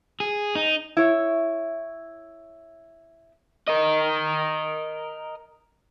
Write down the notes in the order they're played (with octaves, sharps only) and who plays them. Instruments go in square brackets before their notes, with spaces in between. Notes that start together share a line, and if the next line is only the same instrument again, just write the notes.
[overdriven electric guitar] G#4
D#4
[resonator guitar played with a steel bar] E4 C#5
[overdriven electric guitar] A#4 D#5